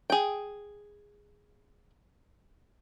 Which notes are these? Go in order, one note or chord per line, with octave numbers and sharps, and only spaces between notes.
G#4 G5